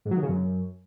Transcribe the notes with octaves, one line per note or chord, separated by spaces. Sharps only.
G#2
F#3
D#3
C#3
F#2